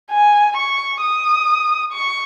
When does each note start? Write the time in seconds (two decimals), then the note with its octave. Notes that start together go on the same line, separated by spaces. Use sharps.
0.11 G#5
0.56 C#6
1.02 D#6
1.92 C#6